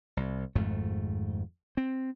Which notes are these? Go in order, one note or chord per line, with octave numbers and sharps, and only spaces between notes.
C2
G#1 F2 G#2 A3
C4